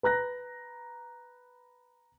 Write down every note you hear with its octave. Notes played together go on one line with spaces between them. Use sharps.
B4 A#5 F#6 A#6